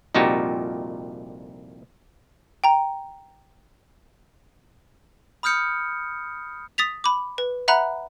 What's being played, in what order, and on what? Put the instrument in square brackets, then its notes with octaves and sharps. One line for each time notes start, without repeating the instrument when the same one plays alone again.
[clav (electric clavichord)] C2 F2 A#2 D#4 F#4 G4
[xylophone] G5 A#5
[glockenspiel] B5 D#6 F6 G6 C#7
[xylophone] D#6 A6 B6 F7
B5 D6
B4
E5 F#5 A#5 B5 F#6